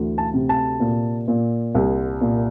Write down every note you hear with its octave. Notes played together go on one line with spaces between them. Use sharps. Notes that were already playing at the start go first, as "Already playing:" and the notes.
Already playing: D2 E3
A5
C3
A5
A#2
A#2
C2
A#2